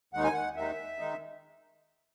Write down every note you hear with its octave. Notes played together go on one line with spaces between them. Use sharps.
D#2 D#3 G#3 D#4 F#5
G#5
F#5
D#2 D#3 G#3 D#4 E5
D#3 G#3 D#4